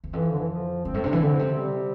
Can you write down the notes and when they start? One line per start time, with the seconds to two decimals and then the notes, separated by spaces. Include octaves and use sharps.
0.04 E2
0.13 F2 E3
0.32 D3
0.40 E3
0.49 F3
0.85 G2 C4
0.94 A2
1.03 C3 D4
1.13 E3
1.21 D3 C4
1.35 B2
1.39 C3
1.58 G3